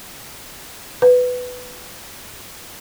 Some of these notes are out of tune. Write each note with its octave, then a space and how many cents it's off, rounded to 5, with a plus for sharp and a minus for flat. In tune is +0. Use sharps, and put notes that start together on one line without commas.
B4 +10